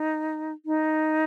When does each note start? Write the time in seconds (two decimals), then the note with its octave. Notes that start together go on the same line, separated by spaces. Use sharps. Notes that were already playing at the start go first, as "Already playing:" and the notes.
Already playing: D#4
0.66 D#4